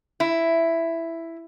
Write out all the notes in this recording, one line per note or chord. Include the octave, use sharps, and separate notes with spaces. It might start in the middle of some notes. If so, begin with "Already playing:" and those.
E4